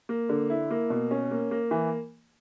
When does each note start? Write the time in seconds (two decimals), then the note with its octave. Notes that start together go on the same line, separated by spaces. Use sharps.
0.09 A#3
0.29 D3
0.50 E4
0.71 A#3
0.90 B2
1.11 C#4
1.31 A#3
1.51 A#3
1.71 E3